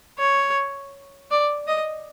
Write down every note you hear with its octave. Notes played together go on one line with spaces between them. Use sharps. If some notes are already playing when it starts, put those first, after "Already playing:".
C#5
D5
D#5